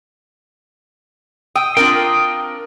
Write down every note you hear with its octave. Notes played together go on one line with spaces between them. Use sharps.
G5 D#6 E6
C4 D4 F4 A#4 G5